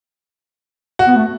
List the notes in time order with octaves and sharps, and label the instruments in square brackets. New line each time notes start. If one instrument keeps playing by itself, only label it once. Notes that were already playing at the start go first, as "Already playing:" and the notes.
[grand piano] F#4
[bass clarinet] B3
A3